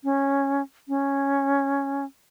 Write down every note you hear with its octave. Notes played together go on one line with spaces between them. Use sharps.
C#4
C#4